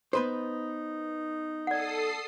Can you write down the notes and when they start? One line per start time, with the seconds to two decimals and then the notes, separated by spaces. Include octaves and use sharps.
0.13 B3 D#4 B4 C5
1.67 A4 D5 F#5 D#6 C7